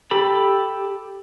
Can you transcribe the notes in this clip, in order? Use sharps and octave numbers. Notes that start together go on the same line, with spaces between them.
G4 A4 B5